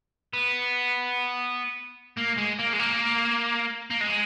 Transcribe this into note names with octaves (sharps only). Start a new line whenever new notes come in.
B3
A#3
G#3
A#3
G#3
A#3
A#3
G#3